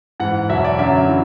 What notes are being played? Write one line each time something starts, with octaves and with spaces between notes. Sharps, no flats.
G#2 E3 F#5
E2 B2 F#3 E5
D5
F#2 D3 F#3 E5
E3